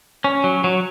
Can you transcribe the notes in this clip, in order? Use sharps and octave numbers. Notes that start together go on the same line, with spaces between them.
C#4
F#3
F#3